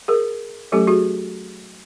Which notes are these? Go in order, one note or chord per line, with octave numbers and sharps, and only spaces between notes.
G#4 A#4
F#3 A3 C#4 G4 A4
F#4 G#4